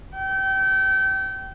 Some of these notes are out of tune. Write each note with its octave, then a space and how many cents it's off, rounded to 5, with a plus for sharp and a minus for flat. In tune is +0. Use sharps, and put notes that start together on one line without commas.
G5 -30